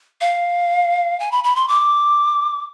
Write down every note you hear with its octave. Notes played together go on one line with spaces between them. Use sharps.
F5
G#5
B5
B5
C6
D6